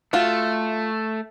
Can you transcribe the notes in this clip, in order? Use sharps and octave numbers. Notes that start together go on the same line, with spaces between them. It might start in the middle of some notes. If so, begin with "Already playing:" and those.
A3 F4 F#4